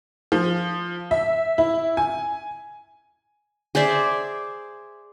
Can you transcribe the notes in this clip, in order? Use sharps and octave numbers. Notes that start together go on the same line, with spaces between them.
F3
E5
E4
G#5
G#4 C5 D5 E5